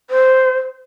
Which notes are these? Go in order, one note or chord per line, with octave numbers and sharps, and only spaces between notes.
C5